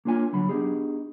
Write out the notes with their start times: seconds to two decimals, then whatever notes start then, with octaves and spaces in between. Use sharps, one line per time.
0.05 A#3 D4 F4 C#5 G#5
0.33 D3 F#3 B5
0.49 B3 D4 D#4 G4 G#4